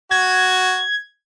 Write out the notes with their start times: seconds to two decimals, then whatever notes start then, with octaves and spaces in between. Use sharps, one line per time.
0.11 F#4 G#6